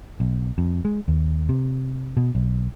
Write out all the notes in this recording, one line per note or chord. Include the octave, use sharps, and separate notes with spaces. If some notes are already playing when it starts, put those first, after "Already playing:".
B1
F2
G#3
D#2
C3
B2
B1